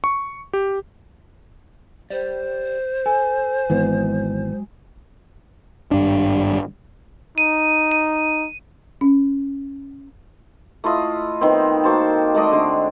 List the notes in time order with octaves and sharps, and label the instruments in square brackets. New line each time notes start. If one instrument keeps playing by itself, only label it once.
[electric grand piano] C#6
G4
[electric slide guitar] G4 D5 [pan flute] C5
[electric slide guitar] A4 [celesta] G#5
[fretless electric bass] G#1 E3 B3 [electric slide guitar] F#3 G#3
[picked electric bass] G#1 G2 D4
[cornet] D#4 [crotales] D#7
[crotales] D#7
[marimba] C#4
[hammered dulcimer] A3 E4 F4 D#5
D#3 B3 C4
A#3 F#4 C5 A5
G#3 A3 D5 D#5
D3 G#3